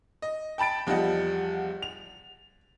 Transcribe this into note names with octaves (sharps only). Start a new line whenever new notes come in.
D#5
G5 A5 B5 A6 D7
E2 F3 G3 D#5 F#5
F7